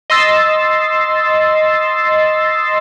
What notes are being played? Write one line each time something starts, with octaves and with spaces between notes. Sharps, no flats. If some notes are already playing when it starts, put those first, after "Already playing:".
D#5 C6 E6 A6 C7